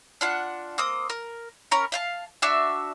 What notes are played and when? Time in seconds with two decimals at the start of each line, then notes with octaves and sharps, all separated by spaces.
0.21 D4 F4 F#5
0.78 A#3 C4 D#6
1.10 A#4
1.71 C#4 A#4 A#5
1.92 E5 F5 A5
2.42 D4 F#4 E5